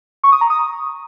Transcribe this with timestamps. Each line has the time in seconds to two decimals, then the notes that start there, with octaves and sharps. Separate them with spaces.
0.24 C#6
0.32 D#6
0.41 A#5
0.50 D#6